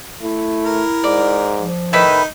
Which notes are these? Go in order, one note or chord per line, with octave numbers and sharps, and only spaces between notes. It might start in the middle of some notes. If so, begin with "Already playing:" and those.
A3 E4
A#4
G#2 D5
F3
A2 D#3 D#4 B4 E5